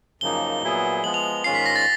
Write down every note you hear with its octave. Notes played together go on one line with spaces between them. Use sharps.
F#2 C#3 F3 A#3 D#4 G7
A#2 F#3 B3 E4 G#4
F3 G#3 B3 F#7
F7
G#2 D#3 G#3 C#4 F4 C7
B6
A#6
A6